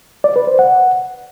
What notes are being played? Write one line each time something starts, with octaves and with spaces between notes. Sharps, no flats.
D5
B4
C5
F#5